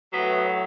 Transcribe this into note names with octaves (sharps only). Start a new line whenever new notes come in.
A2 F#3 B3